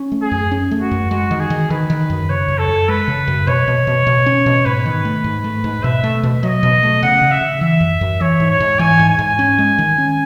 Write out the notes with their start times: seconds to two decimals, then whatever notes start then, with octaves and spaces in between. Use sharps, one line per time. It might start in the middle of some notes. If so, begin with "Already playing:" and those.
Already playing: C#4
0.12 A3
0.22 G#4
0.31 F#2
0.51 C#4
0.71 A3
0.81 F#4
0.91 F#2
1.11 G#3 F#4
1.31 D#3
1.40 G#4
1.50 D#3
1.70 D#3 B4
1.90 D#3
2.10 F#2
2.29 C#3 C#5
2.48 F#2
2.58 A4
2.68 F#2
2.88 G#3 B4
3.08 C#3
3.28 F#2
3.47 B2 C#5
3.68 B2
3.87 B2
4.07 B2
4.26 C#4
4.46 B2
4.65 G#2 B4
4.86 D#3
5.05 A3
5.24 G#2
5.44 A3
5.64 G#2
5.83 B2 E5
6.03 A3
6.23 B2
6.43 F#3 D#5
6.63 B2
6.83 A3
7.03 C#3 F#5
7.21 C#3
7.31 E5
7.41 C#3
7.61 E3 E5
7.80 F#2
8.01 F#2
8.21 E3 C#5
8.40 G#2
8.50 C#5
8.60 G#2
8.79 E3 G#5
8.99 G#2
9.09 G#5
9.19 G#2
9.39 C#4
9.58 G#3
9.78 D#3
9.98 C#4